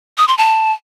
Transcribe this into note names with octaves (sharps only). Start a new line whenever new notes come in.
D#6
C6
A5